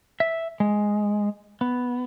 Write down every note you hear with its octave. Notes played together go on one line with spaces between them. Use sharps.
E5
G#3
B3